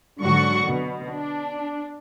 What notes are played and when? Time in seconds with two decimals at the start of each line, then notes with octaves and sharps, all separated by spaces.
0.20 G#2 D3 F#3 F#4 F#5 C#6
0.65 B2
1.10 D4